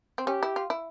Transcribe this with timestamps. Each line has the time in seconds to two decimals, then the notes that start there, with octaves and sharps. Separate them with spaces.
0.18 C4
0.27 C#4 G4
0.43 E4
0.56 F4
0.70 E4